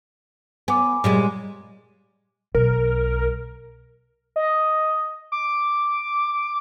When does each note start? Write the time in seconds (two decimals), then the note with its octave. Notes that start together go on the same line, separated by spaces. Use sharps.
0.68 B3 G#5 D6
1.04 A#2 G3 G#3
2.55 B1 A#4
4.36 D#5
5.32 D6